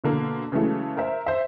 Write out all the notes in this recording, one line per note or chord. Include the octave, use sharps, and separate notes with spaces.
B2 D3 A#3
C#3 E3 F#3 G#3 A3
A#4 C5 E5
C5 E5